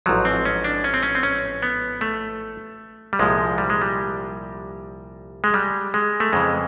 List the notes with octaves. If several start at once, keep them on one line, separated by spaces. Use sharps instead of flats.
A1 G#2 F3 F#3
C4
C#4
D4
C#4
C4
C#4
C4
C#4
B3
A3
G3
C2 A#2 F3 G#3
G3
G#3
G3
G#3
G3
G#3
A3
F2 C#3 E3 G#3